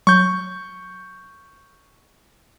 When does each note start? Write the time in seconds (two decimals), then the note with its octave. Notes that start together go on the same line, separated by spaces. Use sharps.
0.07 F#3 C#6 G6